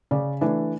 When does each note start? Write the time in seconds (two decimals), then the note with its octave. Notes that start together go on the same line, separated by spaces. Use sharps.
0.11 C#3 D5
0.41 E3 A3 D4